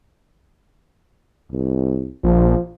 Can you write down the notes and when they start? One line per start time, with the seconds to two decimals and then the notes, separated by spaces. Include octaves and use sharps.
1.52 C2
2.24 A#1 F3